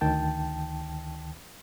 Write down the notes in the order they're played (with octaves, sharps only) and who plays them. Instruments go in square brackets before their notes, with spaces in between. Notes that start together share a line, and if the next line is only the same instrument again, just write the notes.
[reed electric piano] D2 D#3 G5 A5